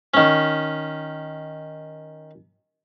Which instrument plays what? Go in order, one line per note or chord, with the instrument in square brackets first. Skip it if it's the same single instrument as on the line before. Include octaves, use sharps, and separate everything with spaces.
[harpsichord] D#3 C#4